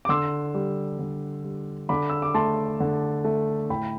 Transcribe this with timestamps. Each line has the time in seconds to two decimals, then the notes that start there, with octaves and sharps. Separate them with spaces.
0.05 D6
0.09 D3 C6 E6
0.54 G3
0.99 D3
1.44 G3
1.89 D3 B5 D6
2.10 E6
2.22 D6
2.34 A3 A5 C6
2.80 D3
3.24 A3
3.69 A2 G5 B5